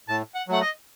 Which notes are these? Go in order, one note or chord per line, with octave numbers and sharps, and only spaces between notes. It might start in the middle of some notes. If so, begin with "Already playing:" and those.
A2 A5
F#5
F#3 A3 F#5
D#5